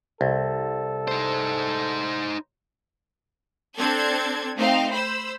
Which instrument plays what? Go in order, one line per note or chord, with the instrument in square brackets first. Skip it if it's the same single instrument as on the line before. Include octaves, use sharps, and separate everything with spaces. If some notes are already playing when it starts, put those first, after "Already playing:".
[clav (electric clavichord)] C2 [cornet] A4
[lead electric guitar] D#4 C5
[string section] C4 D4 A4 G#6
A3 C4 D#4 F5
C5 B5 E6